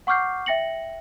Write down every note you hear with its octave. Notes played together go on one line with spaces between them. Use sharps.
F#5 C#6 D6 F6 G6 C7
E5 G5 A#6 C#7 F#7